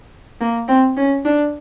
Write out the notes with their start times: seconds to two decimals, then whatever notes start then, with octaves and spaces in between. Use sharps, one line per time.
0.41 A#3
0.68 C4
0.97 C#4
1.25 D4